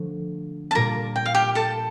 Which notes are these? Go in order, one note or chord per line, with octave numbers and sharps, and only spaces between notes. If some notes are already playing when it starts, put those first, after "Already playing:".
Already playing: D3 F3 A3
A5
A#2 G3 A#3 F4 A#4 A#5
G5
F5
G4 G5
A4 A5